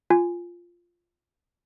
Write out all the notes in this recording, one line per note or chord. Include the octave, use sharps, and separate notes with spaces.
F4 G#5